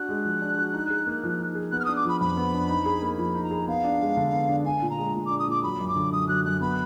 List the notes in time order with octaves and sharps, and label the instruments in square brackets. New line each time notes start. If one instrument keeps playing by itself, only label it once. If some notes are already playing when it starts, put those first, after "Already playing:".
Already playing: [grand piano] D4 F#4 [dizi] F#6
[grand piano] G#3
F3
D4
F#4
D#4
G#4
A#3
F3
D#4
G#4
[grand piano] B3 [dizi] F#6
[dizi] F6
[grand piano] D4 [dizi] D#6
[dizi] D6
[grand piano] F3 [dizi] B5
[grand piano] F2 [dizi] B5
[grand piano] B3
D4
D#4
G#4
A#3
[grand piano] F3 [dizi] B5
[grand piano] D#4
[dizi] A#5
[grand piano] G#4
[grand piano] B3 [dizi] F5
[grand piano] D4
G#3
D3
B3
D4
[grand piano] D4 [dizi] G#5
[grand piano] A#2
[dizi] A#5
[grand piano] G#3
A#2
[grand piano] D4 [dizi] D6
[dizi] D#6
[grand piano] A#2 [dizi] D6
[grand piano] F#3 [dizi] B5
[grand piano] F#2
[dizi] D6
[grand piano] D3
[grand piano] F#2 [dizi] D#6
[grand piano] F#3 [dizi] F#6
[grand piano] F#2 [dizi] F#6
[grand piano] B3 [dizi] B5